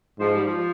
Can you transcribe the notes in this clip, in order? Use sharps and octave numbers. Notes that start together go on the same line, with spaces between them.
G#2 F3
G3
F3